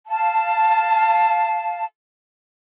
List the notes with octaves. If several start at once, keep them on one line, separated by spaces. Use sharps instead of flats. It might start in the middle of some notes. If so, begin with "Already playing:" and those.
F5 A5